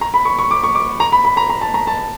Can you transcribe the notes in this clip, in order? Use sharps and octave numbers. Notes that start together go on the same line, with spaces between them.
A#5
B5
C#6
C#6
D6
C#6
D6
A#5
B5
B5
A#5
A#5
A5
A#5
A5